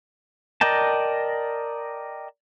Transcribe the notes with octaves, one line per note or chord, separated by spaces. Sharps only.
A#4 D5 D#5 G5 A5